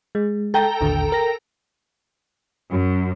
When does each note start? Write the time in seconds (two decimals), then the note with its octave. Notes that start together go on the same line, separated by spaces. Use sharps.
0.15 G#3
0.54 A4 G5 A#5
0.81 A1 D#2 D3
1.12 A#4 A#6
2.71 F#2